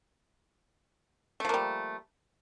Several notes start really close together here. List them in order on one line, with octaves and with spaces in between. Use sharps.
A3 F3 A#3 G3